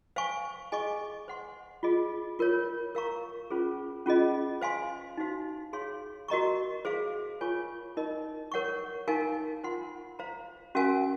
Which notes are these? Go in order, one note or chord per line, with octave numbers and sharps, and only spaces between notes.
C5 F5 G#5 C#6
G#4 D#5 G#5 C#6
C5 F#5 C6
F4 G#4 D#5
F4 A#4 C#5
A#4 F5 A#5 C#6
C#4 F4 G#4 C5
C#4 F4 G#4 D#5
C5 F5 G#5 C6
D#4 F#4 C5 F5
G#4 C#5 F5 C6
F#4 A#4 D#5 A#5 C#6
G#4 C5 F5
F4 A#4 C#5 G#5 C#6
D#4 A#4 D#5
A#4 C#5 F#5 C#6
D#4 A#4 F5 G#5
F4 C5 F#5 C6
C5 F5 A#5
C#4 F#4 A#4 F5 G#5